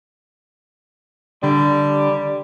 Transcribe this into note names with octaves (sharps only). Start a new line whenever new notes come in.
D3 G3